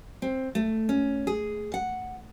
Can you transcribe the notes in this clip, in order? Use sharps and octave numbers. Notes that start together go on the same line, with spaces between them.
C4
A3
C#4
G#4
F#5